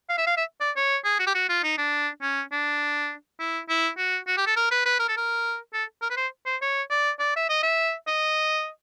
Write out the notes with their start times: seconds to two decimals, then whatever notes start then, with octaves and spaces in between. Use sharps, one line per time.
0.09 F5
0.18 E5
0.27 F5
0.37 E5
0.61 D5
0.76 C#5
1.05 G#4
1.19 F#4
1.27 G4
1.35 F#4
1.49 F4
1.63 D#4
1.78 D4
2.22 C#4
2.52 D4
3.40 E4
3.69 E4
3.97 F#4
4.27 F#4
4.37 G4
4.47 A4
4.56 A#4
4.71 B4
4.85 B4
4.99 A#4
5.08 A4
5.17 A#4
5.73 A4
6.02 A#4
6.10 B4
6.17 C5
6.46 C5
6.62 C#5
6.90 D5
7.19 D5
7.36 E5
7.49 D#5
7.63 E5
8.07 D#5